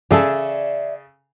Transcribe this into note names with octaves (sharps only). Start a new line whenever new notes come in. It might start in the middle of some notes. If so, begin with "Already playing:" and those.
C#3 G#4 A4 D5 E5